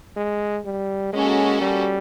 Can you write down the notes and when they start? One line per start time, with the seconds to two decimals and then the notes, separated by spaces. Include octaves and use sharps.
0.16 G#3
0.65 G3
1.13 G#3 A#3 C#4 F#4 A4
1.62 G3